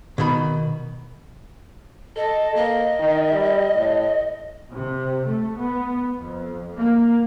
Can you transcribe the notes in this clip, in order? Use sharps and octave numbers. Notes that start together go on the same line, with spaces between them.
B2 D#3 B5
A4 D#5
A#3 D#5
D#3
G3
A2
C3
A3
B3
F2
A#3